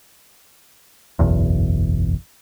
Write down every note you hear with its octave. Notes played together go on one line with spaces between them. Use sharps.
F#1 B1 E2